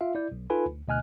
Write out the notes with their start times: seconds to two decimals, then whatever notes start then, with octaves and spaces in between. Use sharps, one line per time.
0.01 F4 E5 F5
0.15 E4 D5 G6
0.32 B1
0.50 D#4 F4 A4 B4 G#5 B5
0.66 D2
0.87 D2 B2 D#5 G#5 F6 F#6